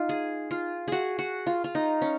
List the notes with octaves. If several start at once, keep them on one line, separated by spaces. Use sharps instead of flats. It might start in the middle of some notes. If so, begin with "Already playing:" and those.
Already playing: D#4 F4
G#4
F4
F#4 G#4
F#4
F4
F4
D#4
C#4